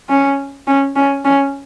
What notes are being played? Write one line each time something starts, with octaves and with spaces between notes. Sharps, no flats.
C#4
C#4
C#4
C#4